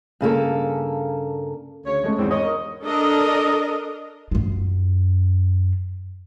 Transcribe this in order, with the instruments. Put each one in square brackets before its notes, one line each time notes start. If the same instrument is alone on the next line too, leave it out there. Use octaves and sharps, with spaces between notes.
[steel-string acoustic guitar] G2 C#3 A#3 A4
[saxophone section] D2 C#3 C#5
[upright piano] G#3 A3 C#4
[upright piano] G#1 E2 [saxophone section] C4
[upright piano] C#5 C#6 [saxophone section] D#5
[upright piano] A#4
[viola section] D4 A4 A#4 D#5
[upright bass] F#2 F4